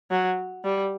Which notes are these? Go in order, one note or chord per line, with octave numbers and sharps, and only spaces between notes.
F#3
G3